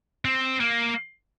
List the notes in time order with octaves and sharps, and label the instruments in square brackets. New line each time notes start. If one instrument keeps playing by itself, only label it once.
[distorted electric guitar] C4
A#3